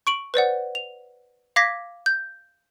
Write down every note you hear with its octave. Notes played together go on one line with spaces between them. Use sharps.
C#6 D7 F#7
B4 C5 D5 F#5
F7
F5 D6 G#6 A#6 B6
G6